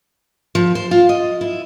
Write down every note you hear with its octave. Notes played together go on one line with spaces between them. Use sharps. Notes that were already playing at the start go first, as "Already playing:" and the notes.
F3
C5
F4
D#5
E4